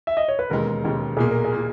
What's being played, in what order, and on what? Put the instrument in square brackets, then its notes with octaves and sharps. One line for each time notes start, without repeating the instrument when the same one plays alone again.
[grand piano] E5
D#5
C#5
B4
[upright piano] E1 D#2 C#3 G#3 [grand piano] A#4
[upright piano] E1 D#2 C#3 G#3
[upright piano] B1 A#2 A#3 [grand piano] G#4
[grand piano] A#4
G#4
[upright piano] A#2 A#3